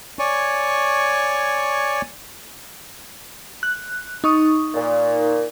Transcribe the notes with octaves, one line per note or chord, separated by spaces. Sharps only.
C#5 D5 G#5 C#6
F#6
D#4 C#6 D#6
A#2